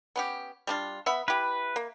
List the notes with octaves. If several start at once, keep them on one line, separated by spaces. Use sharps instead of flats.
B3 C#4 G4
G3 D4 F4
B3 E5 B5
E4 G4 B4
A#3